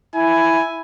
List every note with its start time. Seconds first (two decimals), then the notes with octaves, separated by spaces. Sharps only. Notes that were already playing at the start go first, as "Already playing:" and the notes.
0.15 E4 G#5